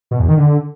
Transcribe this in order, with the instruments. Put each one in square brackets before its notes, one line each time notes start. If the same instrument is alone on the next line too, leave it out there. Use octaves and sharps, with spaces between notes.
[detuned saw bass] B2
E2
D#3
D3